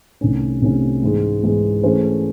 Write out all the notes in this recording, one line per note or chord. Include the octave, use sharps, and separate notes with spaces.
C2 C3 D#3 A3 C#4
C2 C3 D#3 A3 C#4
G#2 E3 G#3
G#2 E3 G#3
E3 A3 C#4 G#4 C5